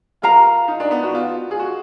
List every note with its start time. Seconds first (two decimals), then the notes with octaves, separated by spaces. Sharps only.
0.22 F4 A#4 F5 A#5
0.68 D#4
0.80 D4
0.91 B3
1.03 F#4
1.15 F4
1.51 G#4
1.59 F#4